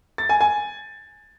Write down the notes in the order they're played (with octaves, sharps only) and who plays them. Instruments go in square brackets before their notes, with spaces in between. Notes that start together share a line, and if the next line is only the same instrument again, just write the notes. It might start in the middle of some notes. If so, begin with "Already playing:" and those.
[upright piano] A6
G#5
G#5